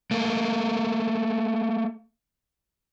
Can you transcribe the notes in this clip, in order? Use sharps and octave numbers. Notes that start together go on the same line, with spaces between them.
A3 A#3